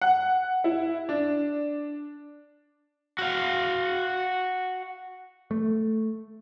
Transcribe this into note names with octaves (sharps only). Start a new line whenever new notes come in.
F#5
E4
D4
F#4 F5
A3